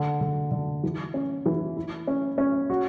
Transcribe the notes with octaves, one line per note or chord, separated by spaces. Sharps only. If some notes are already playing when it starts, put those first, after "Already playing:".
Already playing: D3
D3
D3
E3
C#4
E3
E4
C#4
C#4
F#4